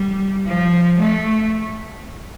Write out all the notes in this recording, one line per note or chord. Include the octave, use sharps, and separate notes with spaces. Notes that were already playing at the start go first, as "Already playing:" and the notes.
Already playing: G3
F3
A3